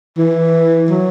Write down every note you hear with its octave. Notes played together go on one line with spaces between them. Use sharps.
E3
F#3